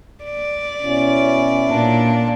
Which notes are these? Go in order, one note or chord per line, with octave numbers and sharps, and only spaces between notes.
D5
B2 C#4 E4
A#2 D4